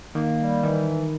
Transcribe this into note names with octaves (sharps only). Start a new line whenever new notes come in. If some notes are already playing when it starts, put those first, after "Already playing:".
D#3 A#3
G3
D#3 E3